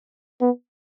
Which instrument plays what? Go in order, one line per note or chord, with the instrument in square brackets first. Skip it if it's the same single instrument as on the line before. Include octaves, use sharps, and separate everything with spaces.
[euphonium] B3